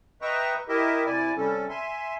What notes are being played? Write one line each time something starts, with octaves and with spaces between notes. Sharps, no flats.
B4 D#5 E5 G5 A#5 C#6
E4 G4 A#4 D#5 E5
C3 E4 D5 G#5
C3 G3 C#4 A4
E5 G#5 C6